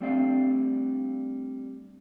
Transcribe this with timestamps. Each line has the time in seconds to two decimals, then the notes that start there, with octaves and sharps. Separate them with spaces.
0.01 G3 A3 C4 D4 D5 F5